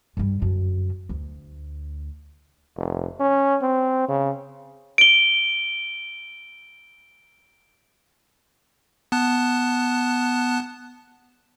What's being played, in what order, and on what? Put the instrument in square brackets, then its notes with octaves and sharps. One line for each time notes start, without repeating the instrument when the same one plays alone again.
[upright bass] G2 G3
F#2 D3
D2
[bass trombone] F1
C#4
C4
C#3
[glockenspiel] D7 G7
[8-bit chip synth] B3 A5 F#6